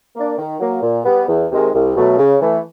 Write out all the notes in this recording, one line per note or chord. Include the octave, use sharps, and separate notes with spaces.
A#3 D4
D#3
F#3 A#3
A#2
G3 B3
E2
C3 D#3 G#3
C2
B2 F#3 A3
C#3
E3 A3